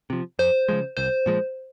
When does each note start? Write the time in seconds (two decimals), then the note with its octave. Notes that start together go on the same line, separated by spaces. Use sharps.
0.10 C3 F3
0.39 F2 C5
0.68 C#3 F3 G#3
0.97 C2 C5
1.26 A#2 F3 G#3